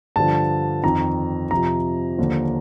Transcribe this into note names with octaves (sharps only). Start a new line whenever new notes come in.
G2 D3 F3 A5
F2 D#3 A#5
F2 C3 F3 A#5
D#2 D3 F3